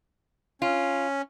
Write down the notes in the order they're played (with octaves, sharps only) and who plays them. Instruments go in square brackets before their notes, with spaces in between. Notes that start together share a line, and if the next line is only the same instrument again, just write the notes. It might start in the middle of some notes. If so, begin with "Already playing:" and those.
[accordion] C#4 [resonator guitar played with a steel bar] F4